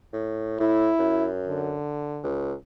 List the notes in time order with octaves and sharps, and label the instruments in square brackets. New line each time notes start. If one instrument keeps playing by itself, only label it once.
[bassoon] A2
[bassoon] A2 [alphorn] E4
[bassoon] F#2
[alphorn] D3
[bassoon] C#2